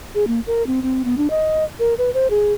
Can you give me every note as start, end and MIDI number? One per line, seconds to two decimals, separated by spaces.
0.15 0.27 68
0.27 0.40 58
0.47 0.65 70
0.67 0.80 60
0.83 1.02 60
1.04 1.15 59
1.18 1.30 62
1.30 1.64 75
1.79 1.94 70
1.98 2.13 71
2.14 2.28 72
2.30 2.53 68